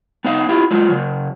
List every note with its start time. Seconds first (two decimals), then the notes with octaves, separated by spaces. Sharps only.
0.24 B3 D#4 F5
0.49 E4 F4 G4
0.71 F#3 G#3 F4
0.90 C#3 F#3